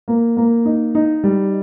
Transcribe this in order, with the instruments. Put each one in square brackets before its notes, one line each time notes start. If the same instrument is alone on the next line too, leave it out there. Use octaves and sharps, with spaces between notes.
[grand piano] A#3
A#3
D#4
D#4
G3